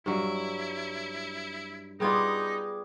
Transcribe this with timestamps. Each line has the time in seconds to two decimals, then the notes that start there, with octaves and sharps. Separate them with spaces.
0.06 G2 F#3 E4
2.00 G3 B3 D#4 F4 G#4 D6 G#6